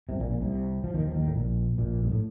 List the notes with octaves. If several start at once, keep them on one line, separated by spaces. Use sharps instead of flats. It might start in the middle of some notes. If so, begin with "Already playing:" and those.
C2 C3
A#1 A#2
A#1 A#2
C2 C3
F3
D#2 D#3
F3
D#2 D#3
A2
A#1 A#2
A#1 A#2
G2
A2